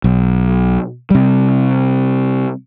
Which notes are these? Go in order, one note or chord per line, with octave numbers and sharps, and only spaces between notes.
B1
C3 G3